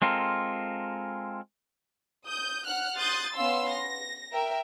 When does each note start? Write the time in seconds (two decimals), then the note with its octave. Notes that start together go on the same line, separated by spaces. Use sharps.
0.02 G#3 C4 F4 A4 A#4
2.28 D#6 G6
2.67 F#5 F6 F#6
2.98 C6 D#6 F#6 G6 A6
3.35 B3 C#4 F5 C6 E6
3.71 A#6
4.33 A#4 E5 G5